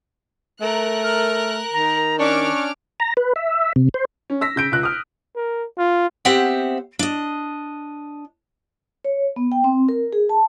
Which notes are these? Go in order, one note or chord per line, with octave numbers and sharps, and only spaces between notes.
A3 A#4 F#6
F6
D#3 A#5
C#4 D4 C#6 D6 F6
A#5
B4
E5
C3
C5
C#4
E6 A#6 B6
C#3 G6 D7
C#2 F#6
D#6 F6
A#4
F4
B3 C4 G4 C5 E5 F#5
D4 D#5
C#5
B3
G5
C4
A#4
G#4
A5